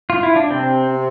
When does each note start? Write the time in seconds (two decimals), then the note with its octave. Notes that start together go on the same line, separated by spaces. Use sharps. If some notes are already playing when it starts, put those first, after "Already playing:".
0.10 F4
0.23 E4
0.36 D4
0.50 C3 C4